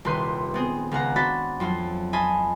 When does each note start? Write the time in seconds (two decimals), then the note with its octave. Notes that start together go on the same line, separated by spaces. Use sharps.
0.05 D#1 C2 B4 C6 G6 D#7
0.54 B3 C4 G#4
0.91 C#2 F5 F#5 A#5
1.16 C4 D4 F#4 B5 A6 B6
1.60 F2 F3 F#3 F4
2.13 F4 D#5 G#5 A5 B5